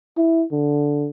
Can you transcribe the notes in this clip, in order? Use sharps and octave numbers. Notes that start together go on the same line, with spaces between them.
E4
D3